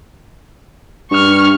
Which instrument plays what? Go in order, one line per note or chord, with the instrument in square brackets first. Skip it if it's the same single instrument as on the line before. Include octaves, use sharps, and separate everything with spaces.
[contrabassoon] G2 [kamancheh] C#6 F6